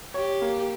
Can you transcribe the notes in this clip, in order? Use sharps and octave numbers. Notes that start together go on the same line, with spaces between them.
G4 C#5
A#3